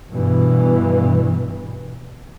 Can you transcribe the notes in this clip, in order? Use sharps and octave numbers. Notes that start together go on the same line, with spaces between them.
G2 B2 E3